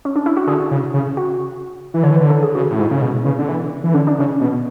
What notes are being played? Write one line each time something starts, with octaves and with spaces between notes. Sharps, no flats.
C#4
D4
E4
F#4
D3 G#4
C#3
C#3
F#4
E3
D3 C#5
E3
D3 B4
A4
G#4
C#3 F#4
A2
G#2 E4
C#3
B2
C#3 B3
D3
E3
E3
D3 C#4
D4
C#3 C#4
B2